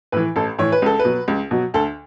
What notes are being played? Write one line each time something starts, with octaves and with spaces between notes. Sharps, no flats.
A2 E3 B4
A1 A4
A2 E3 C#5
B4
C#2 A4
B4
B2 F#3
C#2
B2 F#3
D2 A4